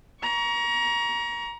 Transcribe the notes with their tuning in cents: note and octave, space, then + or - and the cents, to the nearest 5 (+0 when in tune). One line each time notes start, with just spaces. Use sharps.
A#5 +25 C#6 +30